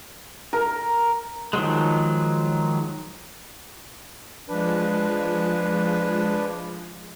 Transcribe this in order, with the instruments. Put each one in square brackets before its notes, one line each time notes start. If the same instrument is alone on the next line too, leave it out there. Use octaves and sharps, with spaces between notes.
[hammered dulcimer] A#4
[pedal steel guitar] D#3 F3 F#3 G#3
[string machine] F3 G#3 [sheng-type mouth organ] D4 B4